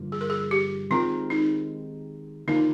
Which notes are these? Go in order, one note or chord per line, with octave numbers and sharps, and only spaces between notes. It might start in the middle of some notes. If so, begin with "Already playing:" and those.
Already playing: G2 D3 F3 A#3
G#4
A#4
G#4
G4
D#3 G#3 C4 F4 G4 A#4
D#4
D#2 D3 F3 A#3 D#4